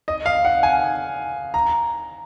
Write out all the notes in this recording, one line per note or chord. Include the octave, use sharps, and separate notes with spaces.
D#5
F5
F#5
G#5
A#5